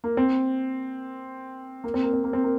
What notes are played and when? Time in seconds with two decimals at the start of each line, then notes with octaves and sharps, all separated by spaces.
0.04 A#3
0.17 C4
1.84 A#3
1.94 C4
2.03 A#3
2.13 C4
2.24 A#3
2.33 C4
2.44 A#3